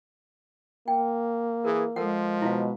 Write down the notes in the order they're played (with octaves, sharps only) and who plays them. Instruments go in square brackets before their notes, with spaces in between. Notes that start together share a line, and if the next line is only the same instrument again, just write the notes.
[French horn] A#3 [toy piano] G5
[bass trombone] E3 [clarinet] G#4 [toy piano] A#4
[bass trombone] F3 [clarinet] G#3 [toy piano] A4 A#4 F#5
[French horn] B2 [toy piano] E4 C5 F5